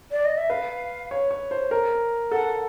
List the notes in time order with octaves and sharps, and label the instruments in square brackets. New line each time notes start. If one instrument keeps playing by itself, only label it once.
[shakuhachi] D5
D#5
E5
[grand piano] B4 [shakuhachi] F5
[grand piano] C#5
C#5
C5
A#4
[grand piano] A4 [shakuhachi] F#5